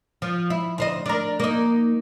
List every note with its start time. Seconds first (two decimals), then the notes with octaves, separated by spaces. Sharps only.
0.22 F3
0.50 E4
0.78 D2 C5 D#5
1.06 D4 A#4
1.40 A#3 D#4